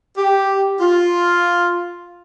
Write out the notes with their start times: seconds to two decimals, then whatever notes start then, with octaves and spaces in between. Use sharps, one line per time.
0.18 G4
0.80 F4